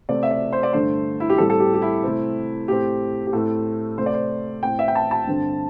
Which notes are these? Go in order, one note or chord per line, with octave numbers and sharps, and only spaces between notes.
C3 A3 C4 D5
E5
D5
C5
D5
G2 D3 A3 C5
E4
G4
A2 G3 C4 A4
A4
G4
G4
E4
C3 A3 C4
A2 A3 C4 G4
G4
A2 A3 C4 A4
C3 A3 C4 C5
D5
C5
A2 A3 C4 G5
E5
G5
A5
A5
G2 D3 C4